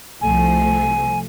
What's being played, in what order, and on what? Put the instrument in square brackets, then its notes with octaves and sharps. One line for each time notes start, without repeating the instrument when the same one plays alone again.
[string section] C2 F3 A3 [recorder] G#5